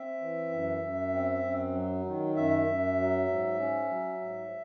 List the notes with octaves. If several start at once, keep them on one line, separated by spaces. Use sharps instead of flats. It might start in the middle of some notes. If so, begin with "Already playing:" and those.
Already playing: C4 E5
E3
F#2
F#2
C4
F#2
F#3
D#3
F#2 E5
F#2
F#3
G#2
C#4
F#3
G#2